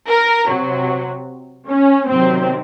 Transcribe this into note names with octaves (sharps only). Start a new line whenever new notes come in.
A#4
C3 F#3
C#4
C3 D#3 F#3 C4